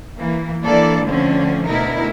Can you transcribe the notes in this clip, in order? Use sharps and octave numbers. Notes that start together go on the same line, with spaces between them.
E3 A#3
E3 A#3 D4 A4 D5
D3 F3 A3 C4 C#4
D2 B2 D#4 E4 A#4